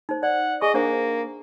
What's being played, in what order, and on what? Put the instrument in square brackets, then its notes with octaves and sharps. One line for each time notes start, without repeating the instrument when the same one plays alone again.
[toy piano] D#4 C5
[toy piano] D5 [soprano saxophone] F#5
[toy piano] G#4 G#5 C#6 [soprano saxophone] D#5
[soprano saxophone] A#3 [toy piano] D4 C5 F#5